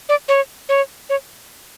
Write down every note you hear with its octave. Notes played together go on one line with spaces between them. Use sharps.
D5
C#5
C#5
C#5